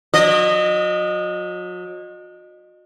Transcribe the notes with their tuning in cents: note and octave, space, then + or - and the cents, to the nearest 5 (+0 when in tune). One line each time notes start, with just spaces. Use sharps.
F#3 -40 D#5 -25